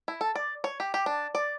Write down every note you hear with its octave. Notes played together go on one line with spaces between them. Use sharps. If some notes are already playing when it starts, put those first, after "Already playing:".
E4
A4
D5
C#5
G4
G4
D4
D5